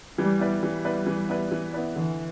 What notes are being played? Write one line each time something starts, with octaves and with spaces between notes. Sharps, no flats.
E3 G3
B3 E4 B4 D5
E3 G3
B3 E4 B4 D5
E3
B3 E4 B4 D5
E3
B3 E4 B4 D5
D3 E3